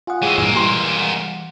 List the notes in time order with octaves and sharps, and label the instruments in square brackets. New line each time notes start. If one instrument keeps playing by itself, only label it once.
[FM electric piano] F4 F5 F#5 [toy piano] G#5 D#6
[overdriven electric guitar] A2 G#3 [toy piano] G#4 G5 E6
[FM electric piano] G2 A#2 E3 [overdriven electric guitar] G#3 A#3 [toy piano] C5 E6
[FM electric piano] E3 G3 [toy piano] G4 G5 C6
[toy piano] F5 F#5